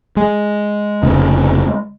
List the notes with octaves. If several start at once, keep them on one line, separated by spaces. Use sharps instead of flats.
G#3
F1 F2 C#3